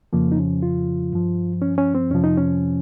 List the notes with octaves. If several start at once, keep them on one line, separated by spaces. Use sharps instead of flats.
F2 C#3 F3 A#3
D#4
C#4
F4
G2 F3
C#4
C#4
C4
F2 C3 F3 C#4
D#4
C#4